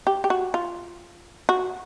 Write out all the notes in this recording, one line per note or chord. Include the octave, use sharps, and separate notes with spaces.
G4
G4
F#4
F4
F#4